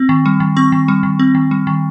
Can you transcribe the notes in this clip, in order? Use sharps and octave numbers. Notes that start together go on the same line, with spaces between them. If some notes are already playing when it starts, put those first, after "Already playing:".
Already playing: C4
D#3
G3
D#3
C4 C#6
D#3
G3
D#3
C4
D#3
G3
D#3